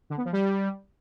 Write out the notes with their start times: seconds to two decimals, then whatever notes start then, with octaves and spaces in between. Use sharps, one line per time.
0.10 D3
0.18 B3
0.25 F3
0.33 G3